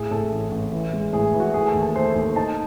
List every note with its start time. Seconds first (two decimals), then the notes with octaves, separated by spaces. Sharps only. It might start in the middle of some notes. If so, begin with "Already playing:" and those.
Already playing: A2 G#4
0.11 A2 A4
0.32 A1
0.52 A1
0.72 E3
0.93 G#3
1.13 A2 G#4
1.34 E3
1.40 F#4
1.54 A3 G#4
1.67 A4
1.74 D#2
1.82 A4
1.95 A3 C5
2.04 A4
2.13 D#2 C5
2.36 D#4 A5